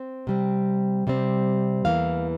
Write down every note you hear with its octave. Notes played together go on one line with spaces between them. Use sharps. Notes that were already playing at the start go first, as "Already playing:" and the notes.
Already playing: C4
C3 G3 C4
C3 G3 C4
E2 E3 A#3 F5